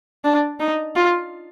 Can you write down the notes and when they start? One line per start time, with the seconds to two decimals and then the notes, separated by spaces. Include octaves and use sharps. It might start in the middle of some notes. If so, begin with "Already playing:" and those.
0.25 D4
0.60 D#4
0.96 F4